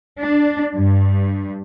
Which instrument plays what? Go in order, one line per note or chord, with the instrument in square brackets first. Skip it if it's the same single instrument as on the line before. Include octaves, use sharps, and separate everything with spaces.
[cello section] D4
G2